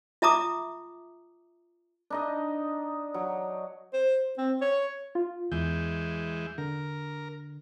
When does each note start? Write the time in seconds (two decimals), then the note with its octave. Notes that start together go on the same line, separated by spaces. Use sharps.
0.22 F4 E5 A5 A#5 D6 D#6
2.10 D4 D#4 D#5
3.14 F#3
3.94 C5
4.38 C4
4.62 C#5
5.15 F4
5.52 E2 E3 G#3 G6
6.58 D3 A#4